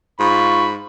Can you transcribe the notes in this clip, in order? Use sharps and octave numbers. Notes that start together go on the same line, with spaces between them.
G#2 F4 B5 C#6